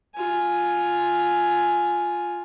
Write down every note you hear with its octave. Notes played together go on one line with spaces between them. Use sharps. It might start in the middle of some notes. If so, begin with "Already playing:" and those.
F4 G#5